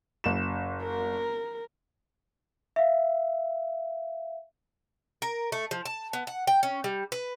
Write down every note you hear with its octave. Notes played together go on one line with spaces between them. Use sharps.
F#1 E7
A#4
E5 F5
A#4
A3
F3
A5
B3
F#5
G5
C#4
G3
B4